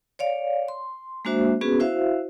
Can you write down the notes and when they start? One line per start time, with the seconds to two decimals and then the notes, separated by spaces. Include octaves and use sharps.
0.19 C#5 D5 F5
0.68 C6
1.25 G#3 A#3 D4 F#4 C5 E5
1.61 B3 C#4 F#4 G#4 B4
1.80 E4 F#4 C5 E5 F5